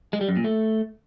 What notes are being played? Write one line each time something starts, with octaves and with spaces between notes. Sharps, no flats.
G#3
G3
F#2
A#2
A3